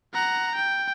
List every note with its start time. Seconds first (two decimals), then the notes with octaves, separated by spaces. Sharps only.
0.14 F#5 A#5
0.54 G5